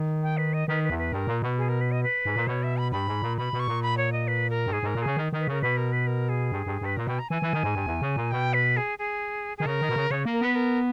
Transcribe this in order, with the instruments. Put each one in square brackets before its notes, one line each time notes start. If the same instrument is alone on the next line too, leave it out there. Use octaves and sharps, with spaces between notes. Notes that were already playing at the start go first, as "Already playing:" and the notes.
Already playing: [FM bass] D#3
[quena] G5
B4
D#5
[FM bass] D#3 [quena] B4
[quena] B4
[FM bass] E2
[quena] B4
[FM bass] G2 [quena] A#4
[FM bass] A#2
B2
[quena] G#4
A#4
B4
D#5
B4
[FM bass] G#2
A#2
[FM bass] B2 [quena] C#5
[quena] E5
B5
[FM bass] G2 [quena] B5
[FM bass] G#2
A#2
[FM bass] B2 [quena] B5
[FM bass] B2
[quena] C#6
[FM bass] A#2
[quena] B5
C#5
D#5
B4
A#4
[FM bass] G2
[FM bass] G#2 [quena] G#4
[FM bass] G#2 [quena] A#4
[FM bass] A#2
[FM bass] C#3 [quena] G#4
[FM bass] D#3
D#3
[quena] B4
[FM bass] C#3 [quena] A#4
[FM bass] B2 [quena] B4
[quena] A#4
B4
A#4
G#4
[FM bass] G2
G2
[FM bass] G2 [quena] B4
[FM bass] A#2 [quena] A#4
[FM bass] B2 [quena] G5
[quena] A#5
[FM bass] E3 [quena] G#5
[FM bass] E3
D#3
G#2
G2
E2
C#3
A#2
[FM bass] B2 [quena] G5
[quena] B4
G#4
G#4
[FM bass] D#3 [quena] G#4
[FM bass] C#3 [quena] A#4
[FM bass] D#3
B2
C#3
[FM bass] C#3 [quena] C#5
[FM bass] A#3
[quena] A#4
[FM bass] B3 [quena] B4
[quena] A#4